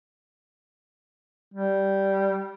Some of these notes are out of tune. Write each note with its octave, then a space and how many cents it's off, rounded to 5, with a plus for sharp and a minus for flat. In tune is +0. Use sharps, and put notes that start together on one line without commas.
G3 -10